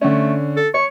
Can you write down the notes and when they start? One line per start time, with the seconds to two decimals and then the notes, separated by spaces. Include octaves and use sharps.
0.01 D3 A3 C#4
0.57 A4
0.74 C#5 C#6